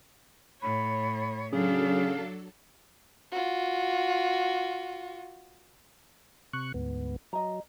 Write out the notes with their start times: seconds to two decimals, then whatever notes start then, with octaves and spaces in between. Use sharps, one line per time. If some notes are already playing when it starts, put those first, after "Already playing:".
0.62 A2 C#5 B5
1.52 C#3 F#3 D4 A4 F5
3.32 F4 F#4
6.53 C3 C#6 F#6
6.74 D2 G#2 B3
7.33 F#3 D#5 A#5